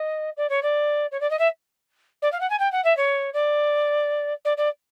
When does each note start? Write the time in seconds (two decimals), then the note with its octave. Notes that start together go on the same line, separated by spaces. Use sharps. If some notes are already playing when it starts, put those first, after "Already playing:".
Already playing: D#5
0.37 D5
0.49 C#5
0.63 D5
1.11 C#5
1.20 D5
1.30 D#5
1.39 E5
2.22 D5
2.32 F5
2.40 F#5
2.50 G#5
2.59 G5
2.72 F#5
2.84 E5
2.97 C#5
3.33 D5
4.45 D5
4.57 D5